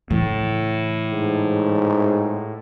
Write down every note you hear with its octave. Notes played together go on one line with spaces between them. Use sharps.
A2 C#3 E3
G#2